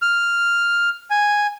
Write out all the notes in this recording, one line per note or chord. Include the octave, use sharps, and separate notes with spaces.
F6
G#5